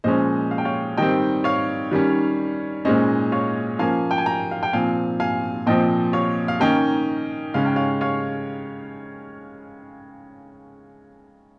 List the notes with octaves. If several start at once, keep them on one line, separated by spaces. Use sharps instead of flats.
A#2 F3 G#3 C#4 C5 D#5
F5
G5
C#5 F5
D#3 G3 C4 D#5 G5
C#5 F5
D#3 G3 C#4
A#2 G#3 C#4 C5 D#5
C#5 F5
F3 A#3 C#4 F5 G#5
G5
G#5
G5 A#5
F5
G5
A#2 F3 C4 F5 G#5
F5 G#5
A#2 F3 C4 D#5 G5
C#5 F5
F5
D#3 A#3 C#4 D#5 G5
C#3 G#3 C#4 F5
G5
C#5 F5
C#5 F5